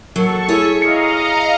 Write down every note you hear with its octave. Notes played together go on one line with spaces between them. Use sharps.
F#3 A#3 A4 C#6
E4 G#4 C#5
D#5 F5 A#5 C#7